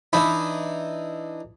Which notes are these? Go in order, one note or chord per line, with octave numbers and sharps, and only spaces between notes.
E3 D4 D#4 E5 B5